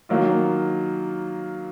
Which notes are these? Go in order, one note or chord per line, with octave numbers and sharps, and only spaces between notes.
D#3 F#3 A#3 F4